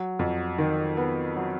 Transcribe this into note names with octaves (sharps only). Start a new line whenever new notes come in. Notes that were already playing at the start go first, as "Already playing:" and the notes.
Already playing: F#3
F2
D#3
B3
F#3